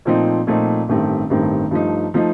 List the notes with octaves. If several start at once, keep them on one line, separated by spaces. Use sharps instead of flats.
A#2 F3 A3 C4 D#4
A#2 F3 A3 C4 D#4
A1 G2 D#3 A3 C4
A1 G2 D#3 A3 C4
G2 F3 A3 D#4
F3 A3 D#4